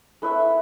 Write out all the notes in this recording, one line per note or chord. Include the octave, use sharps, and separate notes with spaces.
A3 E4 B4 E5